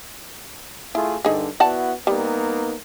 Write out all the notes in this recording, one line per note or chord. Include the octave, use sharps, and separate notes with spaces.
A3 E4 F4 G#4
G2 D3 D#4 G#4
B3 E4 F#4 D5 F#5 A5
G3 A#3 B3 D#4